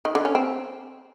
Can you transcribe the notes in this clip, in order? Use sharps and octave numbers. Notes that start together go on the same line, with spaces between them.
D#3
D3
C#4
C4